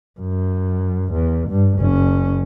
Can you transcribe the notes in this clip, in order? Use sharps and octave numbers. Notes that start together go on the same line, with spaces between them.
F#2
E2
G2
F#1 C#4